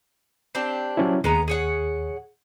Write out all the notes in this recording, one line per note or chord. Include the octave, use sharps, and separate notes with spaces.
C4 D4 G4
F#3 C#4 E4
D#2 G#3 B3 A#5
G#4 C#5 F#5